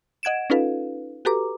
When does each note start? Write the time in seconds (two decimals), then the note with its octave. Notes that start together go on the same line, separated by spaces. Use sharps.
0.23 D#5 F#5 G#6 D7 E7
0.50 C#4 D#4 F4 A4 B4 F5
1.25 F#4 G4 A4 B4 A#5 D6